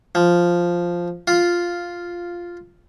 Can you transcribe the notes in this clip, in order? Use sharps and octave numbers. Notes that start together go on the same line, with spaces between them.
F3
F4